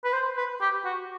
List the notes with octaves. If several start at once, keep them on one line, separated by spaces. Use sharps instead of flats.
B4
C5
B4
G4
F#4